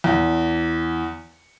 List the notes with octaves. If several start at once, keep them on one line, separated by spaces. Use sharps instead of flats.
E2